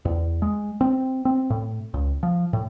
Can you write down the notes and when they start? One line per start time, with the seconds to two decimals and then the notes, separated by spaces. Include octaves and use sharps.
0.05 E2
0.42 G#3
0.81 C4
1.25 C4
1.50 A2
1.94 C#2
2.23 F3
2.53 A2